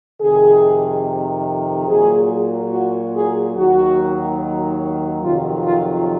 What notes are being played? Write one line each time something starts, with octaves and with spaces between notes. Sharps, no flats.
F2 C3 D#3 G#4
A#2 F#3 G#4
F#4
G#4
D#2 D#3 F#3 F#4
F2 C3 D#3 F#3 F4
F4